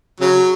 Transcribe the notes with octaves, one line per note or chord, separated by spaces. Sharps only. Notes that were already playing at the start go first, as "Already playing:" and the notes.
C#3 F#3